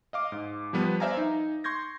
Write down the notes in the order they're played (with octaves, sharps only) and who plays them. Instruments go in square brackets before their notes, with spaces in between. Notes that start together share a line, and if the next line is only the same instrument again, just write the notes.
[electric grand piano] D#5 F5 D6
G#2
F3 G3 B3 B4
C5 D5 E5 F5 G#5 A#5
D#4
C6 C#6 G6 G#6 A#6